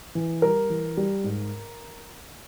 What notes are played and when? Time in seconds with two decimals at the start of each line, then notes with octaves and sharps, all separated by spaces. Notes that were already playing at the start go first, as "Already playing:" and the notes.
0.15 E3
0.42 G3 A#4
0.70 E3
0.97 G3
1.24 G#2